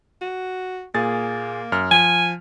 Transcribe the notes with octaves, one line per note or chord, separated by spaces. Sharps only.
F#4
A#2 A#3 G#4 A6
F#2 F6
F3 G#5